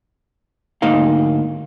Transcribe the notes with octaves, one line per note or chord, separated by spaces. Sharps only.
D2 G#2 A#3 D#4 F5